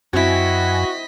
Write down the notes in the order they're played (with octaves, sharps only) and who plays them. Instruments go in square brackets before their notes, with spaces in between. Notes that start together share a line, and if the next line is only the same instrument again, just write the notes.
[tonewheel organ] F#2 G#5 [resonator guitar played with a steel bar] C4 E4 [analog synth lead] F#4 [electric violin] D#5 B6